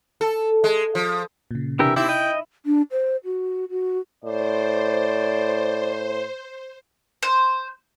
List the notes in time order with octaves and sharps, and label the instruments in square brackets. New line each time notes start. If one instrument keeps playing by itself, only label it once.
[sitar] A4
G#3
F3
[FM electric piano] A#2 C#3
[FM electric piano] C3 D4 [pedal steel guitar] E3 G4 A#4 [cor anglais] E5
[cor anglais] C4 [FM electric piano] D#4 [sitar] E4 [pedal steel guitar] G4
[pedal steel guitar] D#5 [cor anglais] G5
[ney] D4
C5
F#4
F#4
[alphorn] A2 [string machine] C5 [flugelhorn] D5
[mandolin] C5